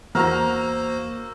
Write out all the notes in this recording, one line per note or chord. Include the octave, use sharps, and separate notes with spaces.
E2 A#3 F#4 A#4 C5 A#5 C#6 E6